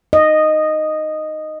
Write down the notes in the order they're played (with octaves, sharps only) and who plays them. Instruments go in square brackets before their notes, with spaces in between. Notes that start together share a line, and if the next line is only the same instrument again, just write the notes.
[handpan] D#5